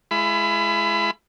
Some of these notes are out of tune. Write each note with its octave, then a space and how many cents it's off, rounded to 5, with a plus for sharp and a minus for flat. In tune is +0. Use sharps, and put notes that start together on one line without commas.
G#3 +20 E4 +40 B5 +20